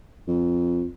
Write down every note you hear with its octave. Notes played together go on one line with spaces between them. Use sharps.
F2